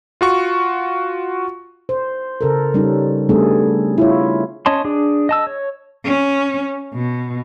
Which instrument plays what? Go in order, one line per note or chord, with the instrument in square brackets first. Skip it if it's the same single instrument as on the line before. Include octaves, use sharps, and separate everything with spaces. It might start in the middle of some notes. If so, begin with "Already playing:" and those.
[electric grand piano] F4 F#4 C#6
[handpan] C5
C#3 A4 A#4
G3 C#4 D#4
G3 A3 B3 D4 G#4 A4
E4 F4 C#5
[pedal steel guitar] C#4 C#5 D#5 A5 C6
D4 G#4
D#5 A5 E6
C#5
[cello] C#4
B2